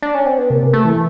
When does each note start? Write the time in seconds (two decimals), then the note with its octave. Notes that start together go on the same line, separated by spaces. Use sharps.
0.02 D4
0.15 C#4
0.26 C4
0.38 B3
0.50 C3 A#3
0.73 A3
0.85 E3